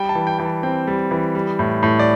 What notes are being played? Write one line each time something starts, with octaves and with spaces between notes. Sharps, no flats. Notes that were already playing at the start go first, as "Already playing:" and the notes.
Already playing: G3 G5
A5
E3
G5
E3 G5
A5
C4 G5
G3
E3
G3
A2
A2
D5